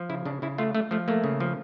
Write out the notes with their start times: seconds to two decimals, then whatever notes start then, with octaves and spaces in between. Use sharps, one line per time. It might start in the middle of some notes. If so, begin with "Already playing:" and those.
Already playing: F3
0.09 C#3 E4
0.25 C#3 D4
0.42 C#3 E4
0.58 A3 F4
0.75 A3
0.91 F3 A3
1.08 A3 A#3
1.24 C#3
1.40 F3